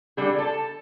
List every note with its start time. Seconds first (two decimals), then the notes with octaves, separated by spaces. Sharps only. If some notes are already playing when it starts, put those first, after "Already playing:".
0.17 D3 G3 G#4
0.38 A4 A5